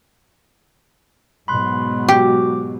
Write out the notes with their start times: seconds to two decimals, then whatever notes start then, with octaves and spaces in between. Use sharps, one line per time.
1.48 G#2 B2 F#3 B5 C6 F#6
2.09 F#4 G4 D6